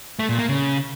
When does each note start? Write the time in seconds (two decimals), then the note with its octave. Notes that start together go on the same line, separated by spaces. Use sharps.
0.19 A3
0.29 A#2
0.39 A#3
0.49 C#3